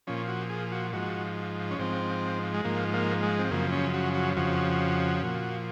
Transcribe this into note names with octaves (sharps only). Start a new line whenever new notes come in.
A#2 F3 C#4
F#4
G#4
F#4
G#2 F3 F#4
C#4
G#2 F3 C4
G#3
G#2 F3 A#3
A#3
G#3
C4
F#2 C#3 F3 A#3
C#4
F#4
F#4
F2 C#3 F3 F#4
A#2 F3